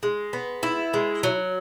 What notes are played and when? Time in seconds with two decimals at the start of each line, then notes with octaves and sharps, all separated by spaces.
0.03 G#3
0.33 B3
0.63 E4
0.94 G#3
1.23 F#3